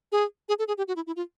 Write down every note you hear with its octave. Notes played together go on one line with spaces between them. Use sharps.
G#4
G#4
A4
G#4
G4
F#4
E4
E4
F4